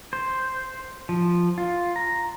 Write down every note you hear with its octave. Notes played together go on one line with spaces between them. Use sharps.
C5
F3
F4
A#5